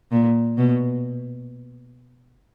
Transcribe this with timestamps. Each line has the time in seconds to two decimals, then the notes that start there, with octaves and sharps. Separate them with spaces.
0.12 A#2
0.58 B2